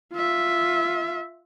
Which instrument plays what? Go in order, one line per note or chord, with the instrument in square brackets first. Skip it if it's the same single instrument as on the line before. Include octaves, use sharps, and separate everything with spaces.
[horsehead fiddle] F4 E5